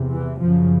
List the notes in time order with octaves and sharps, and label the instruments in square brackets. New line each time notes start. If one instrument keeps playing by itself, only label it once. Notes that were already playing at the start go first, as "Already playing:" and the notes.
Already playing: [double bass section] E2 C3
E3
F#2 C#3 F3